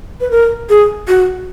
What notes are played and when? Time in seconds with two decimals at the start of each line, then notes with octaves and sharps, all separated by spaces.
0.20 B4
0.30 A#4
0.69 G#4
1.07 F#4